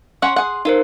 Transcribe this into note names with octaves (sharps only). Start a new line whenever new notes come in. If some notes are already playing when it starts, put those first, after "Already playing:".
C#4 C#5 F#5 C6
G#4 F#5
D#4 F4 A#4 C5